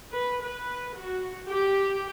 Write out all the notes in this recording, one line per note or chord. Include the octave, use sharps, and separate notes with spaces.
B4
B4
F#4
G4